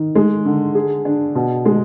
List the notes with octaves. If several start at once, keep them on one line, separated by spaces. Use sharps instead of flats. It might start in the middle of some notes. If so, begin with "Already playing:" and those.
Already playing: D#3
G#3
D3
G#4
D4
B2
G#3